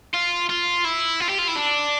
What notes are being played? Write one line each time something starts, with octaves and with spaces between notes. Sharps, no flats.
F4
F4
E4
F4
G4
F4
E4
D4